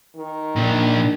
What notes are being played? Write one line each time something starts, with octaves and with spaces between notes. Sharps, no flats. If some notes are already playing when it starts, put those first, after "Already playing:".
D#3
A#2 D4